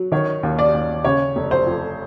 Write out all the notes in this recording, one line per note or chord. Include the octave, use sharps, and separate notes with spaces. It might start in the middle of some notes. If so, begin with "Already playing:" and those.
Already playing: F#3
D#3 C#5
D#2
D5
D#2
C#3 C#5
F1
C5
F2